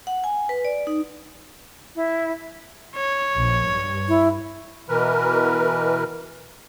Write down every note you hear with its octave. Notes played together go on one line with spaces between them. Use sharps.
F#5
G#5
B4
D5
D#4
E4
C#5
A#1
G2
E4
B2 E3 A#4 B4